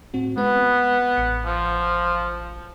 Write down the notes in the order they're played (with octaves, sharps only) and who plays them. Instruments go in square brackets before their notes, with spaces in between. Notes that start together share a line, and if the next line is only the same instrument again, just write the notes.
[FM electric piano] A2 C4 F#4
[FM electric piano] G#3 B4 [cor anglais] B3
[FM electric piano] A1 C#7
[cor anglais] F3